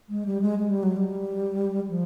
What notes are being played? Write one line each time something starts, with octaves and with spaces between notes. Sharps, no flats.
G#3
G3
G#3
G#3
G3
F#3
G3
F3